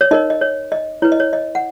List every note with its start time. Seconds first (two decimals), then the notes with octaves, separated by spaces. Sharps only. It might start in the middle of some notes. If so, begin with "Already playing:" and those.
0.01 C#5
0.11 D#4 A#4 C#5 D#5
0.30 D#5
0.41 C#5
0.72 D#5
1.02 E4 B4 C#5
1.12 D#5
1.20 C#5
1.33 D#5
1.55 F#5